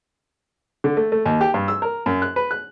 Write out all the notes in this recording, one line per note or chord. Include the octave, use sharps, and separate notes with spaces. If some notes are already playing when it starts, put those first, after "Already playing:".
D3
A3
A3
D#2
G4
G2
E6
A#4
F#2
F#6
B4
F#6